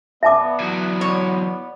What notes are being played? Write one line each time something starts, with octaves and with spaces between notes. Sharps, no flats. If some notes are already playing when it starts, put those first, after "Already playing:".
B3 D5 E5 A5 D6
E3 F#3
C#5